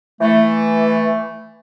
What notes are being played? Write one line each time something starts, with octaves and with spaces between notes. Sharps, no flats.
E3 A3